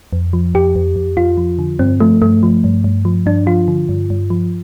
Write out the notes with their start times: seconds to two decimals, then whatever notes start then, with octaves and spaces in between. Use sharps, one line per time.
0.13 F2
0.33 F3
0.54 F2 G4
0.76 F2
0.96 F2
1.17 F2 F4
1.37 F3
1.59 D3
1.79 G2 C4
2.00 F3 A3
2.22 G2 A3
2.43 F3
2.64 G2
2.84 G2
3.05 F3
3.26 G2 D4
3.47 F3 F4
3.68 D3
3.89 G2
4.10 G2
4.30 F3